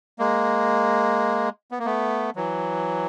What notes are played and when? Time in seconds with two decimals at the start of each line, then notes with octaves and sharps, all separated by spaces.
0.19 G#3 A#3
1.71 B3
1.79 A#3
1.85 A3 B3
2.36 E3 F#3